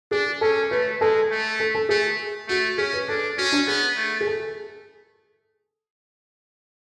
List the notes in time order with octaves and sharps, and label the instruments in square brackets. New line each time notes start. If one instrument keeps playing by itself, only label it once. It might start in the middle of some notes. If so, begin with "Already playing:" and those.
[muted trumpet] D4 [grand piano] G#4
[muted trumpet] C#4 [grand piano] A4
[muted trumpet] A3 [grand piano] B4
[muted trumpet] G#3 [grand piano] A4
[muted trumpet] A3
[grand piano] A4
A4
[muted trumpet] A3 [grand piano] G#4
[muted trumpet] A3 [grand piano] F#4
[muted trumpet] C#4 [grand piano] G#4
[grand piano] B4
[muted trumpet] D4 [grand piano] A4
[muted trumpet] C#4 [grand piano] F#4
[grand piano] D4
[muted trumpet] B3 [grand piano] G#4
[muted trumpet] A3
[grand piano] G#4
A4